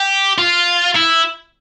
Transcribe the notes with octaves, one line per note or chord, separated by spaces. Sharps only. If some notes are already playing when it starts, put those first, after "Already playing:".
Already playing: G4
F4
E4